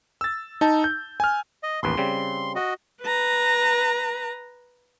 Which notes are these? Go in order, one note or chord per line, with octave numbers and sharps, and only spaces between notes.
E6 A6
D#4 A5
G6
G#5 F6
D#5
A1 D#2 B4 C6
C#3 G3 C4
F#4 D#5
B4 A#5